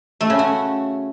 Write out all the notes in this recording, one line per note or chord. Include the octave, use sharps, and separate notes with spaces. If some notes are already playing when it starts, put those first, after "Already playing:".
A3
C#3
F#4